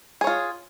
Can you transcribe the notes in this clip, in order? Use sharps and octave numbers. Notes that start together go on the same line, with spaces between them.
F4 G#4 C#5